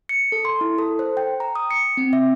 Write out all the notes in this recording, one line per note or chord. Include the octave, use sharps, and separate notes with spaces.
C#7
A4
C6
E4
A4
C5
G5
A#5
D#6
C#7
C4
E5